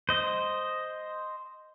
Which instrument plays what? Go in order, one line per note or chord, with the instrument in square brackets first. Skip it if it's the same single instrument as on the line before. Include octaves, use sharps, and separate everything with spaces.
[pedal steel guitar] C5 D#5